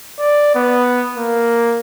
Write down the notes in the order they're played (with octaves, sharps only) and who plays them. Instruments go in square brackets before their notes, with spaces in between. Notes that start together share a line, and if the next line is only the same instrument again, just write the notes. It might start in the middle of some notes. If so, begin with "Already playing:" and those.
[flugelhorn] D5
B3
A#3